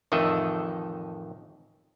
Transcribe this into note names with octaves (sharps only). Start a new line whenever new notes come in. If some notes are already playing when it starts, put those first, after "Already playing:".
A1 F2 D#3 A3 D#5 E5